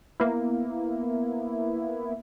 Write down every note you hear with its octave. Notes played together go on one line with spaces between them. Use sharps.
A#3 B3 E4